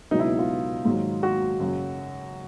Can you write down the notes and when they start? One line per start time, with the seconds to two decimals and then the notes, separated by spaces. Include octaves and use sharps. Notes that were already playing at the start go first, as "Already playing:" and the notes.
0.11 C#2 B2 F#3 D#4
0.19 E4
0.39 F4
0.85 G#2 D#3 F#3
1.23 F#4
1.60 F#2 C#3 F#3